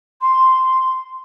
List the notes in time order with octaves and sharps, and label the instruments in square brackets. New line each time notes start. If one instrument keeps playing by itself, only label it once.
[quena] C6